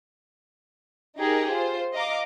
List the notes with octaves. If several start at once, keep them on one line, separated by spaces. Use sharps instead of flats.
D#4 G4 G#4 A#4
F4 C5
D#5 F5 A#5 D6